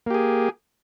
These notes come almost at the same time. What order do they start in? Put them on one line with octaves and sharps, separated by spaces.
A#3 G4 G#4